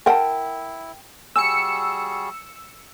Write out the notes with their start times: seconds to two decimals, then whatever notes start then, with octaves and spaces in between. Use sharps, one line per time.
0.06 E4 A#4 F#5 G5 A5
1.36 G3 F#4 G#4 G#5 E6 C#7